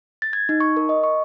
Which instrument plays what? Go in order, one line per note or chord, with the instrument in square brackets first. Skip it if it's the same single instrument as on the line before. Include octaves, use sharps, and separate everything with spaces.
[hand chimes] A6
G#6
D#4
C#6
A#4
D#5
C#6